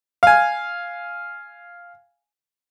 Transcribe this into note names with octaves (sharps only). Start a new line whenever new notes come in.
F5 G#5